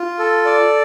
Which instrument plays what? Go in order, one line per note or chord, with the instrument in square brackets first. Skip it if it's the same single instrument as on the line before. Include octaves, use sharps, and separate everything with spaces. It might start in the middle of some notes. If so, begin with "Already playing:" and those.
Already playing: [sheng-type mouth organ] F4
A4
D5